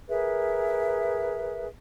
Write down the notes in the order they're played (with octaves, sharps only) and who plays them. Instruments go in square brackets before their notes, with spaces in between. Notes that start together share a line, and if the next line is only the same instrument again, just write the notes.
[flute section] G#4 A#4 B4 E5